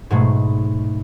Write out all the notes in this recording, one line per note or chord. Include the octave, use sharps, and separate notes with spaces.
G#2 B2 F#3 G#3 A3